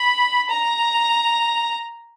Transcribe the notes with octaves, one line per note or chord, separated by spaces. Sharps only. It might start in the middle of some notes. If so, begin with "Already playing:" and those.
Already playing: B5
A#5